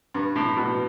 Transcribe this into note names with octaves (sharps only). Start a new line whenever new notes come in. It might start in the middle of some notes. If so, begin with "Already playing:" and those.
G2
A2
B2